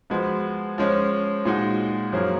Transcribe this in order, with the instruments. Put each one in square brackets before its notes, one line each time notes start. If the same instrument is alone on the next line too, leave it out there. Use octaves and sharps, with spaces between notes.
[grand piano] F3 G#3 B3 F#4
F3 G#3 C#4
A#2 G#3 D#4 F#4
F#2 F3 A#3 C#4 G#4